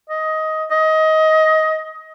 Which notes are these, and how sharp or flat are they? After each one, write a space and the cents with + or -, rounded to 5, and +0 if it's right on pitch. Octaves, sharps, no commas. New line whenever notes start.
D#5 +15
D#5 +20